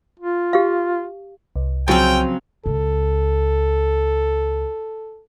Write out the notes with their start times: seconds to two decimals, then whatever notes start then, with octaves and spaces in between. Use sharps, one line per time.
0.19 F4
0.53 G4 F5
1.56 C2
1.88 C#3 F3 F#3 C4 C#4 G5
2.66 C#2 A4